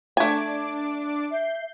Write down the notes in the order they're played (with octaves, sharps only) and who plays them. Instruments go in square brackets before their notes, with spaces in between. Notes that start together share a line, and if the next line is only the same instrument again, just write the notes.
[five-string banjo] A3 G#5 [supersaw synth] D4 D6
[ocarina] E5 [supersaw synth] G6 C7